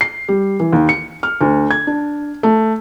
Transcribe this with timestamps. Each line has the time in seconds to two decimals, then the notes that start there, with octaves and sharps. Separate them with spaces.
0.01 C7
0.28 G3
0.60 E3
0.73 D#2
0.89 C#7
1.23 F6
1.41 D2
1.71 G#6
1.87 D4
2.43 A3